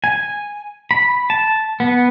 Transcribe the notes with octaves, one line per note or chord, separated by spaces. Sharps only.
G#5
B5
A5
B3